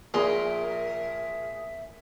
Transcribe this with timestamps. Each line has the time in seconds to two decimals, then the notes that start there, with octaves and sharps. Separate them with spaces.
0.14 A#1 A#2 G#4 A#4 E5 C6